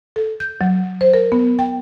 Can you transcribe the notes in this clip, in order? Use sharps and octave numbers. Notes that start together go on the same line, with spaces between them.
A4
G6
F#3
C5
A#4
B3
G5